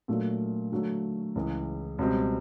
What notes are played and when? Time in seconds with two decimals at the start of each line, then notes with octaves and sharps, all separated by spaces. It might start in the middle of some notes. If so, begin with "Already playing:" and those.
0.08 A#2 F#3 A3 D4
0.72 D3 F#3 A3
1.35 C#2 C#3 E3
1.99 C#2 B2 G3 C4